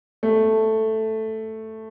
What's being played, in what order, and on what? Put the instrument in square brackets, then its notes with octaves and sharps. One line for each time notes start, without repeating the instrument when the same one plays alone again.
[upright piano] A3